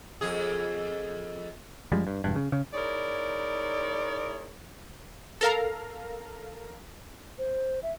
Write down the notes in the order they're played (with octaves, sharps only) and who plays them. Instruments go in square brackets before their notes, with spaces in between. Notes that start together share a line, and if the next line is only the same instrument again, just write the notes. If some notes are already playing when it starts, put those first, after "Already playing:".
[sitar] F2 G#4
[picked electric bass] F#2 F3 G3 G#3
G2
E1 G2
C#3
C#3
[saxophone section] D#4 E4 G#4 A#4 C#5 D5
[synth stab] A4 A#4 F5 A#5
[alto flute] C5
E5